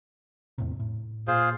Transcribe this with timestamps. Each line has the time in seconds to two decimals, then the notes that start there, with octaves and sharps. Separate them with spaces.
0.58 E2 A2 C3
0.79 A2
1.28 A#2 F4 G#4 C5